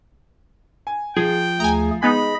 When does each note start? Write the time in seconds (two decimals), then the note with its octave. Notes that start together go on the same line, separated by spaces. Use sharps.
0.87 G#5
1.16 F3 G#4 G5
1.60 D2 A3 G#4 G#5 A#5
2.03 G#3 B3 D#4 G#4 D#5 B5